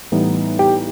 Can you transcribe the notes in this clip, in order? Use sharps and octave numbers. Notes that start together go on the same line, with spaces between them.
A2 E3 G3 B3 D#4
G4 G5